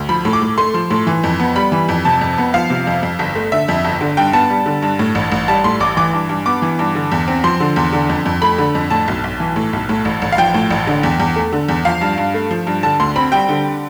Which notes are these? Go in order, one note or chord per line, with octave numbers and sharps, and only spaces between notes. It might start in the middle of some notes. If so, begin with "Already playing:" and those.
Already playing: D2
F3 B5
A2
D6
A2
A3 C6
F3
A2
E3
F2
B3
G3 B5
E3
F2
C3 A5
F2
B3
F3 F5
C3
F2
F2
G1
A3
D3 E5
F2
G1
D3
G2 G5
B3 A5
G3
D3
G2
A2
A1
A1
G3 A5
A2 C6
A1 D6
E3 D6
G2
G2
B3 D6
E3
G2
D3
E2
C4
F3 C6
D3
E2
D3
F2
F2
A3 B5
D3
F2
A2 A5
B1
B1
E3
A2
B1
A2
A1
A1
F5
F3 G5
A2
A1
D3
E2
E2
A3
D3
E2
F3 F5
G2
G2
A3
F3
G2
D3 A5
D2 C6
C4 B5
G3 G5
D3